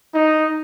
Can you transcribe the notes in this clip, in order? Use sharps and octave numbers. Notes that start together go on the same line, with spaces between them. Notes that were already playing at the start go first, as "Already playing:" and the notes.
D#4